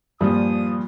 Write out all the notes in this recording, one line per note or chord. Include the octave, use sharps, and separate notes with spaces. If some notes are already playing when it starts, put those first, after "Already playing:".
G2 A#2 F3 D#6